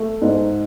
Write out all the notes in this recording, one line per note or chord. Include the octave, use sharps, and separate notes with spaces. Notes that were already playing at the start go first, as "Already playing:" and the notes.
Already playing: A3
G#2